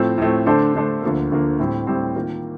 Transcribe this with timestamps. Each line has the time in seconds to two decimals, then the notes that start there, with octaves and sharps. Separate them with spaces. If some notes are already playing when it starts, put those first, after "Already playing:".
Already playing: A2 F3 A3 C4
0.18 A2 F3 A3 C4
0.46 D3 A3 D4 A4 C5
0.74 D3 A3 D4 A4 C5
1.02 D2 D3 F3 A#3
1.32 D2 D3 F3 A#3
1.60 A2 G3 C4
1.87 A2 G3 C4
2.15 D#3 A#3 F4 A#4